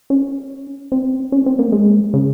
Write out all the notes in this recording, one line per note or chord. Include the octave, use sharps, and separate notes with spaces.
C#4
C4
C#4
C4
A#3
G#3
C#3